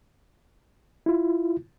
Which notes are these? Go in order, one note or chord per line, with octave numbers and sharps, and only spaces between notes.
E4 F4